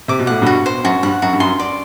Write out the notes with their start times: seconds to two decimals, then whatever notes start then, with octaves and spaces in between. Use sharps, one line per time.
0.08 C3 D6
0.19 B2
0.27 A2 F#5
0.42 G2 B2 F#4
0.66 C5
0.84 F#2 F#4
1.03 G2 F#5
1.22 F#2 F#4
1.33 G2
1.40 F#2 C6
1.60 D5